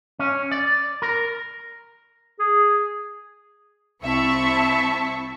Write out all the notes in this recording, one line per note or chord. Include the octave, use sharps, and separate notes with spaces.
C#4
D5
A#4
G#4
C2 C4 E4 E5 A5 C#6